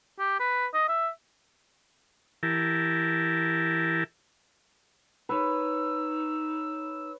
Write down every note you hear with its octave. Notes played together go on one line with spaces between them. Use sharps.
G4
B4
D#5
E5
E3 E4 G4 A#4 A5
D#4 B4 C#5 E6